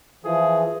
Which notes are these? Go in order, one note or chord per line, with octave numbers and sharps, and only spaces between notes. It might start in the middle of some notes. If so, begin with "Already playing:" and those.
E3 F3 G#4